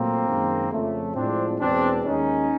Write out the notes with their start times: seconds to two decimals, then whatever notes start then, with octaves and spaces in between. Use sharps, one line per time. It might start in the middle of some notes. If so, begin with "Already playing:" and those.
Already playing: A#2 F#3 A3 A#3 C4
0.26 F#2 D#3 G#3
0.71 F2 C#3 F3 A3
1.15 A2 F3 G#3 C4 D4
1.60 E2 B2 G#3 C4 D4
2.04 D#2 D#3 G#3 C#4 D#4